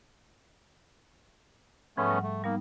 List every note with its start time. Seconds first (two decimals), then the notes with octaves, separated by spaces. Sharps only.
1.97 G#2 F3 A3 B3 C#4
2.11 G3 F#5
2.23 A3
2.44 G3 A#3 B3 D#4